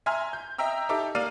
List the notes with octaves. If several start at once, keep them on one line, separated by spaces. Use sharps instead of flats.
E5 G#5 A#5 C6 F6
G6
D#5 E5 G5 A#5 E6
D#4 G4 A4 E5 D6
A#3 D5 F5 F6 D#7